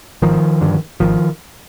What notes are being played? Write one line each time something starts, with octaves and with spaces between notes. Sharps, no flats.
G#1 D#3 F3
G2 D3
G#1 D#3 F3